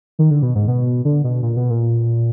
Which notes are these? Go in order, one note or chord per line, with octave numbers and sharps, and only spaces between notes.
D#3
D3
B2
G#2
B2
D3
B2
A#2
B2
A#2